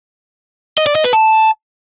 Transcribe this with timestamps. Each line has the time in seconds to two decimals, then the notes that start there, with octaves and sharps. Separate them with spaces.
0.78 D#5
0.86 D5
0.95 D#5
1.04 B4
1.13 A5